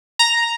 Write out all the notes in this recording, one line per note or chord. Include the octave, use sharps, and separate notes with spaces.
A#5